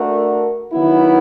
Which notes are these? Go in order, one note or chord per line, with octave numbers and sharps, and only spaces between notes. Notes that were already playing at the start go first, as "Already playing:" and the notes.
Already playing: A3 D4 F#4 A#4
D#3 F#3 B3 E4